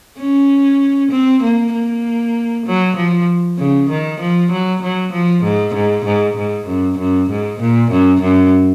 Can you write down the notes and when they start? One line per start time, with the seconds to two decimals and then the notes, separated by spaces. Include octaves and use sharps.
0.19 C#4
1.11 C4
1.42 A#3
1.73 A#3
2.66 F#3
2.96 F3
3.59 C#3
3.90 D#3
4.21 F3
4.52 F#3
4.83 F#3
5.13 F3
5.43 G#2
5.74 G#2
6.05 G#2
6.37 G#2
6.67 F#2
6.98 F#2
7.30 G#2
7.60 A#2
7.91 F#2
8.21 F#2